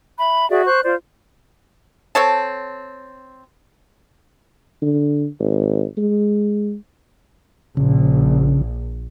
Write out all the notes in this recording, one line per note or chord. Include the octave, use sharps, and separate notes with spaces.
E5 B5
F#4 G#4 D5 E5
C5 C#6 F#6
F4 C5 D5
C4 A4 C#5 A5
D3
G#1
G#3
A#1 C#3